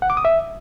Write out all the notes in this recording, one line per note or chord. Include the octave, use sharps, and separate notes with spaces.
F#5
D6
D#6
E5